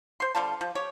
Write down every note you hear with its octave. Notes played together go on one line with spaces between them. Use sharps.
C5 C6
D3 G3 F4 A5
F3
G4 C#5